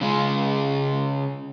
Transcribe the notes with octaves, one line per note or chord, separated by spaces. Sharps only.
C#3 G#3